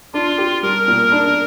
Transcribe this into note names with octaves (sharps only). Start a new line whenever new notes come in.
D4 F4
G4
G3 A#4
A#2
D4